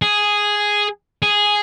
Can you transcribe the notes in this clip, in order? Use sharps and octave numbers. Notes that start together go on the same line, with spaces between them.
G#4
G#4